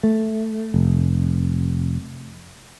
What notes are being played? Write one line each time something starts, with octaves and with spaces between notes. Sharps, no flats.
A3
F1